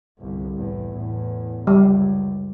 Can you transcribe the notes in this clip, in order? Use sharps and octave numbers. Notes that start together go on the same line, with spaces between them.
G1 C2
E2 A2
E2 A2
C#2 F#2 G3